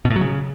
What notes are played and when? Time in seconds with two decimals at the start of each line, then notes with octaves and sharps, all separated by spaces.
0.05 B2
0.10 A2
0.16 F#3
0.21 C#3